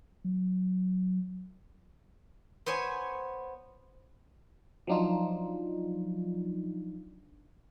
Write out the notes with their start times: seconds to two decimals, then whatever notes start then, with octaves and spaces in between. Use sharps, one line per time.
0.24 F#3
2.66 B3 C5 C#5 G#5
4.87 F3 F#3 D4 D#4 F4